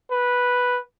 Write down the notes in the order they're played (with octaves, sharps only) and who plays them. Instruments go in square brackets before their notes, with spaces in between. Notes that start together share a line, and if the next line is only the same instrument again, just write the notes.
[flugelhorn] B4